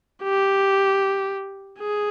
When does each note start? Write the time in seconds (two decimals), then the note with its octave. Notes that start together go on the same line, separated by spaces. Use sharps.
0.23 G4
1.80 G#4